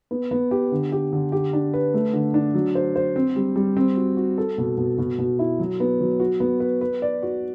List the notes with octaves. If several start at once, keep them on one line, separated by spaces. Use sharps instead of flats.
B3
B3
G4
D3
G4
D3
G4
D4
B4
A3
D3
D4
F#3
C5
C5
C4
G3
G3
C4
F#4
F#4
A4
B2
B2
B2
B2
E4
F#3
B3
F#3
F#4
B3
B4
B4
D5
F#4